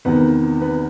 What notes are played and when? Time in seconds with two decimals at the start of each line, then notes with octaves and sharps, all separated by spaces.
0.05 E2 C3 D#3 B3 B4
0.61 B3 B4